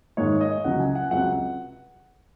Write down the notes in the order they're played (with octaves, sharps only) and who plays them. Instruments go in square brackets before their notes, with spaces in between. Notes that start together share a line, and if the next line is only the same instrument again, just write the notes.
[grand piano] G#2 D#3 G#3 D#4 C#5
D#5
C#2 C#3 F#3 F#5
G#5
F#5
C#2 C3 F#3 F#5